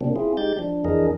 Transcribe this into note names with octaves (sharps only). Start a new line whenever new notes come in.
C3 F#3 A#3 C4 D4
C4 E4 F4 G#4
G#3 D#4 G4 G6 A6
F3 D4
F2 E3 D4 G#4 A#4 D#5